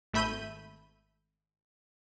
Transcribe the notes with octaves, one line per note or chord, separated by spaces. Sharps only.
G#1 A3 E5 B5 G6 D#7